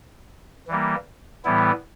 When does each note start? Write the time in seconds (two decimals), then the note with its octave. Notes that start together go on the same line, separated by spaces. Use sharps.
0.68 E3 G3 A#3
1.44 A2 E3 G3 B3 E4